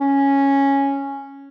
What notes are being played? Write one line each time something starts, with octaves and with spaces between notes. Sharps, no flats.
C#4